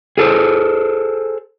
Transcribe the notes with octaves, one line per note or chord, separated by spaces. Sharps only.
G#4 A4 C5